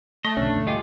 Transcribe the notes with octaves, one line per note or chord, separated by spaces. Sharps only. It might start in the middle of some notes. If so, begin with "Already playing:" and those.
A3 D#5
B1 F2 B2 D3 C#4 D4
D2 G#2 B2
G3 F4 G#4 D#5 G5 D6